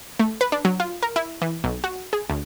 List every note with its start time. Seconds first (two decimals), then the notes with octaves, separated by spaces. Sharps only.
0.19 A3
0.41 B4
0.52 D4
0.65 F#3
0.80 F4
1.03 A#4
1.16 E4
1.42 E3
1.64 B1
1.84 F#4
2.13 G#4
2.30 D2